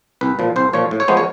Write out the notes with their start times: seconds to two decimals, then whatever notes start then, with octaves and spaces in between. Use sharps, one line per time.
0.21 C2 B4
0.39 A#2 F3
0.56 C2 C5
0.73 A#2 F3 C#5
0.91 A2
1.00 C#5
1.08 F3 G#3 B3 C5
1.17 C#5